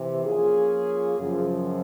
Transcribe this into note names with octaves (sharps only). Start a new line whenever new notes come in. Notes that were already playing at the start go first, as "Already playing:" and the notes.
Already playing: C3 E3
F3 A#3 C#4 F4 G#4
F#2 C#3 F3